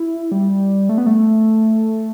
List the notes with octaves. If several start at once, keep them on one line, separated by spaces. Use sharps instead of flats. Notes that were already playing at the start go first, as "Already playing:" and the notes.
Already playing: E4
G3
A3
B3
A3